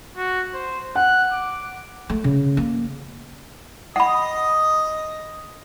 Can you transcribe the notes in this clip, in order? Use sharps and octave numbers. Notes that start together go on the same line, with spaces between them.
F#4
C5
F#5 F#6
D6
A3
C#3
A#3
D#5 F#5 B5 D#6